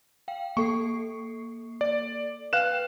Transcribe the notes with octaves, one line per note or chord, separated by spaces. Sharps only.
F5 G5
A#3 A4 C#6 C7
D5
B4 F5 G5 F#6 E7